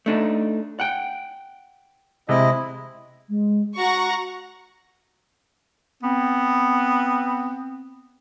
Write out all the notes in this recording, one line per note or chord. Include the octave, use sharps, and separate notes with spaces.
A3 D4 D#4
F#5 G5
C3 G#3 E4 D#5
G#3
F#4 F#5 A#5 C#6
B3 C4